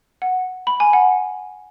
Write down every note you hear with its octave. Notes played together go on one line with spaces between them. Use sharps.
F#5
B5
G#5
F#5